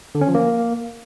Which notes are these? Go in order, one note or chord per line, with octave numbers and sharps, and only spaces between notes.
D3
C#4
F3
A#3